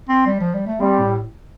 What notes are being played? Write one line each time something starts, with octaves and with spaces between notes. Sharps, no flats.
C4
G3
F3
G3
A3
G3 C4
A2